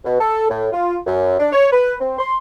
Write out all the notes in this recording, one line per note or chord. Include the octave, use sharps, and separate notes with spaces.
B2
A4
A2
F4
F#2
D4
C#5
B4
C4
C6